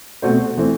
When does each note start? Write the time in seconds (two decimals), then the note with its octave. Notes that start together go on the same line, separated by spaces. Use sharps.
0.22 B2 A3 C4 F#4 C5
0.57 E3 A3 C4